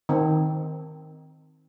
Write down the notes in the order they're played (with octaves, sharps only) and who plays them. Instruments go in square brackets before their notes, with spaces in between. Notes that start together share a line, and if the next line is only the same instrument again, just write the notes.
[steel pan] D#3 C4